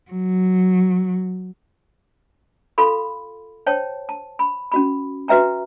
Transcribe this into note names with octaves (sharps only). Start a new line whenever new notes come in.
F#3
F4 A4 F5 B5 C6
C5 C#5 G5 A5
A5
B5
C#4 F#4 B5
F#4 B4 E5 G5 A#5